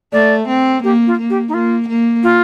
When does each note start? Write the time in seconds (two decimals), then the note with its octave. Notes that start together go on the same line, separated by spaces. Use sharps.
0.13 A3 D5
0.48 C4
0.83 A#3 G4
1.07 F4
1.19 A#3
1.30 G4
1.48 D#4
1.53 A#3 F4
1.89 A#3
2.23 F4